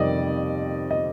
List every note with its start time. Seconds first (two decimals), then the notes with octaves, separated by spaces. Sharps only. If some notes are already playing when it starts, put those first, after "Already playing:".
Already playing: F2 C3 D#3 G3 D5 D#5
0.91 D#5